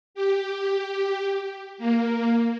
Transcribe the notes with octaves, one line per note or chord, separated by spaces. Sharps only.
G4
A#3